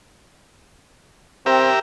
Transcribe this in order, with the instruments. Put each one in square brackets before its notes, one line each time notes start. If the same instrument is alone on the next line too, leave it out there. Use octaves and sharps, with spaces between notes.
[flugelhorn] C4 [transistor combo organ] G4 A#4 E5